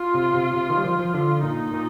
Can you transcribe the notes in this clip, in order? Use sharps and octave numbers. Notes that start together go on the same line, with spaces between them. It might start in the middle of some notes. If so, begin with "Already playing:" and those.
Already playing: F4
C3
C3
C3
D#3
G3
F3
F3
D3 F4
A#2 D#4
A#2